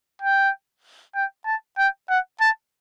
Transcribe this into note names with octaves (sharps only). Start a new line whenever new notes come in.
G5
G5
A5
G5
F#5
A5